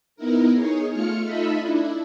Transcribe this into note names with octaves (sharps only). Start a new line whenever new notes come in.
B3 D#4 E4 A#4
D#4 G#4 C#5
A3 F4 F6 C#7
D#4 F4 A4 D#5 E5 B5
D4 E4